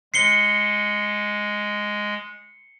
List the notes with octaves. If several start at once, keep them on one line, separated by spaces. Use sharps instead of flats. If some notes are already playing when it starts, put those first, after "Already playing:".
G#3 C7 C#7 G7